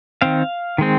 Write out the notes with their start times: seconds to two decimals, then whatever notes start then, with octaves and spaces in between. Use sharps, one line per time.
0.22 D#3 C4 F5
0.78 D#3 G#3 C4